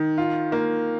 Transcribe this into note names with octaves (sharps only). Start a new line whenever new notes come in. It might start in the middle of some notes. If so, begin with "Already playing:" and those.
Already playing: D#3
F4
A#3